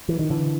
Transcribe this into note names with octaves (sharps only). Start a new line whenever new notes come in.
E3
D#3
D3 E3